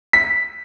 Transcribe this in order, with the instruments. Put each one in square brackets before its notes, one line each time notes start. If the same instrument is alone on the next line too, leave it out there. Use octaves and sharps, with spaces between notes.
[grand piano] B6